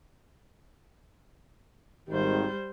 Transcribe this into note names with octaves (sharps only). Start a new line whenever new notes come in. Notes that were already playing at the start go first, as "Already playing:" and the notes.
G#1 D#3 G3 C5